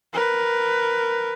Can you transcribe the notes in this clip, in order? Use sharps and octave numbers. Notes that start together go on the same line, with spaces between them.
A#4 B4